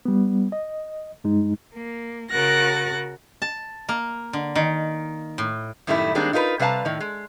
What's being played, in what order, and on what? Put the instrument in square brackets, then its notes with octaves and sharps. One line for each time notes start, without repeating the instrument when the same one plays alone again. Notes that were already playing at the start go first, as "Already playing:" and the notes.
[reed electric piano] G3 B3
D#5
G2 G#3 D#4
[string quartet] A#3
C#3 F#4 A#4 F#6 A6 A#6
[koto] A5
A#3
D3
D#3
A2
[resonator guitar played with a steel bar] F#2 A2 D#3 G3 A3 E4
D#3 G3 G#3 A#3 C4 D4
D#4 F4 A#4 B4
C3 G3 B4 F5 A5 A#5
A2 D#3
G#3